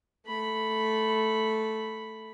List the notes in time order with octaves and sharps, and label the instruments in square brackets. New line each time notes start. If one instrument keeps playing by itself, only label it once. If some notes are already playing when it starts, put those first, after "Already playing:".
[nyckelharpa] A3 B5